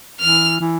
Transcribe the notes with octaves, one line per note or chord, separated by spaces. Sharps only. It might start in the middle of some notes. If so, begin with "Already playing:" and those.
E3 F6
E3